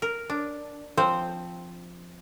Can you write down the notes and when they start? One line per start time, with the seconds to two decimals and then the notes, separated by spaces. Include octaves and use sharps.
0.02 A#4
0.30 D4
0.97 F3 C4 C5